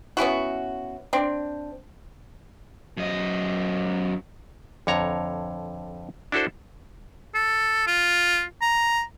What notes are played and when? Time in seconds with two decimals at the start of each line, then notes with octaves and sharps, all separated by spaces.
0.17 B3 C#4 E4 F#4
1.13 C4 D4
2.97 F#2 D#5
4.87 F2 D3 C#5 A#5
6.32 D4 E4 F#4 A4 C5
7.35 A4
7.87 F4
8.62 A#5